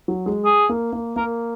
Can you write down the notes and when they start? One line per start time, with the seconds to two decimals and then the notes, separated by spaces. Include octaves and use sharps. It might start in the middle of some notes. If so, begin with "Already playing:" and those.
0.08 F#3
0.26 G#3
0.45 G#4
0.69 A#3
0.93 A#3
1.16 A#3 A#4